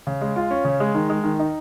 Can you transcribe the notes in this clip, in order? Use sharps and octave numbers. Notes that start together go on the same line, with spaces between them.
C#3
G#3
F4
C#4
C#3
G#3
D#3
G#3
D#3
D#4